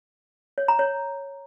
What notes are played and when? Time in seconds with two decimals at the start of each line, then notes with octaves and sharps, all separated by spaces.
0.58 C#5
0.68 A#5
0.79 C#5